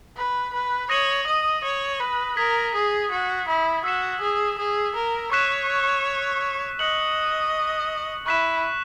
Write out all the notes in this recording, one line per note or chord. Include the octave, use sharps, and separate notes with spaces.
B4
B4
C#5 D#6 A#6 D#7 F#7
D#5
C#5
B4
A#4 D#6 G#6 B6
G#4
F#4
E4
F#4 E6 B6 E7
G#4
G#4
A#4
C#5 C#6 F#6 B6 E7
D#5 F#6 C#7 F#7
E4 C#6 F#6 B6 E7